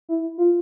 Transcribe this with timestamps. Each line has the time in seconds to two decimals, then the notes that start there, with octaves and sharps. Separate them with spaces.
0.09 E4
0.38 F4